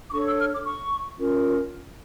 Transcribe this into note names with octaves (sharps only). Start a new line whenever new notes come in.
D6
D4 A4 C#5 C#6
E6
F6
D6
C#6
C#4 F4 A#4